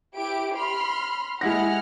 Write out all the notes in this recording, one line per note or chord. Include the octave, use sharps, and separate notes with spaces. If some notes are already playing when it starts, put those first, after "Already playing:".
E4 G4 D7
B5 C6 F6
G#3 E4 F#5 F6 A#6